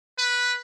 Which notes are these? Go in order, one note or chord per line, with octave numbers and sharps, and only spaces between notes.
B4